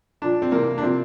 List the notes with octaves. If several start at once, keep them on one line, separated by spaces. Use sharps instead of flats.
A#2 F3 D4
C4
C3 E3 A#3
D4
C3 F3 C4